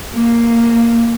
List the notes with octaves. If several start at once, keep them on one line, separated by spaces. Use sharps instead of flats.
A#3